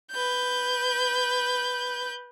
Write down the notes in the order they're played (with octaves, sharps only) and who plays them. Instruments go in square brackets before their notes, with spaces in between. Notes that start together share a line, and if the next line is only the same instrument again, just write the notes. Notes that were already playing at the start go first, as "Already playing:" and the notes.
[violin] B4 G6